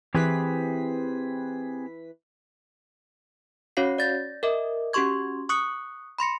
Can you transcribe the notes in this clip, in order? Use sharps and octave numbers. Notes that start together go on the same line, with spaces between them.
E3 C4 G4 G#4 B4 B6
C#4 F#4 C#5 F5 C7
D5 G6 A6 A#6
A#4 D#5 E5 D6
C#4 F#4 G4 C6 C#6 G#6
C#6 D#6 F#6 C#7
B5 C6 A#6 C#7